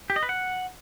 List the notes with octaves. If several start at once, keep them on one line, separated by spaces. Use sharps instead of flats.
G4
D#5
B4
F#5